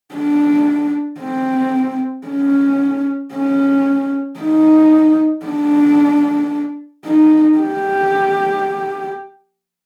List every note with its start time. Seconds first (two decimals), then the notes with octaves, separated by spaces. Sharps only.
0.15 D4
1.20 C4
2.28 C#4
3.34 C#4
4.40 D#4
5.46 D4
7.06 D#4
7.59 G4